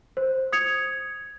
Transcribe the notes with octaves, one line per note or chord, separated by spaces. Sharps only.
C5
D#6 G#6 C#7 F7